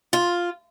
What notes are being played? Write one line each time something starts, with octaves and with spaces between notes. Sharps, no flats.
F4